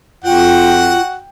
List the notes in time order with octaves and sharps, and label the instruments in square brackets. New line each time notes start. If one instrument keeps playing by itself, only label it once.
[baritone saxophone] F2 [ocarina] F4 [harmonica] F#4 F#5 [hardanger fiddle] G5